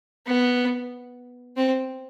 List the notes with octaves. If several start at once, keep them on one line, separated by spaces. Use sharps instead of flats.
B3
C4